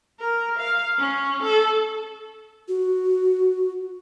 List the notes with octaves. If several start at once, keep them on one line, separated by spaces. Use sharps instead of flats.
A#4
F5
C#4
A4
F#4